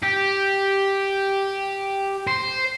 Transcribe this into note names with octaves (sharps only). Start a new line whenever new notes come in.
G4
C5